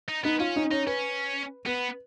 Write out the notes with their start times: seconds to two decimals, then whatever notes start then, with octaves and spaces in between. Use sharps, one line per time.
0.08 D#4
0.24 B3 D#4
0.40 C#4 F4
0.56 D#4
0.71 C#4 D#4
0.87 C#4 B4
1.66 B3 B4